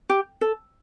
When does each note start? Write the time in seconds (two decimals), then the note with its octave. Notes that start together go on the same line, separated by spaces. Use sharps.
0.09 G4
0.41 A4